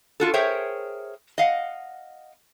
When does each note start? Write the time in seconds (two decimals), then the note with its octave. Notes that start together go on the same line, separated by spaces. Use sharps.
0.20 F4 F#4 A4
0.34 G#4 A#4 C5 C#5 E5 G5
1.38 D#5 F5 F#5